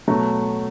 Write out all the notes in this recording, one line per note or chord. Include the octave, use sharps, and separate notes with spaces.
B2 F#3 A3